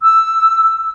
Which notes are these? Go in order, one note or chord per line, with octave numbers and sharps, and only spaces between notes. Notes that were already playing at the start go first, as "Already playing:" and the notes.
E6